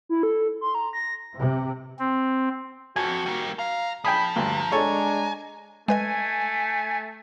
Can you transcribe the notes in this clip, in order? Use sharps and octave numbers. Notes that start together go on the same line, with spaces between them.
E4
A4
C6
A#5
A#6
C3
C4
F2 F#4 G#5
G3 A#3
F5 A#5
F3 G5 G#5 B5 D#6
D2 G2 A#5
G#3 D4 A4 C#5 G#5
G#3 A3 B4 D#5 G#5